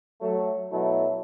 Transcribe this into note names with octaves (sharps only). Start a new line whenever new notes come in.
F#3 A3
B2 F#3 A3 E4